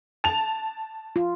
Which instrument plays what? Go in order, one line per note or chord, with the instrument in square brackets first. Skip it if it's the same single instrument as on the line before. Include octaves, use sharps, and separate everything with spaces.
[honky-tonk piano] A5 F7
[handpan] F4